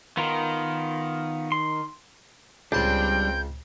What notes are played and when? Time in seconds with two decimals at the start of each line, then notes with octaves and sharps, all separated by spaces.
0.17 D#3 B3 F4 A#4
1.52 C6
2.72 C#2 G3 C4 D4 G5 A5 G6